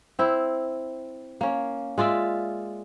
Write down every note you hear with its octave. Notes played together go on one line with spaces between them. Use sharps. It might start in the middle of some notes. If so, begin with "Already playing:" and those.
C4 E4
A#3 C#4
G#3 F4 D5 E5